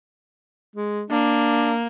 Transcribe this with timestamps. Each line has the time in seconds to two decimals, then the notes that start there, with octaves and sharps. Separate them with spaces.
0.76 G#3
1.10 A#3 D4